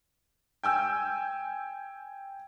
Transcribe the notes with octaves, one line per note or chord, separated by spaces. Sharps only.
G5 G#5 E6 G6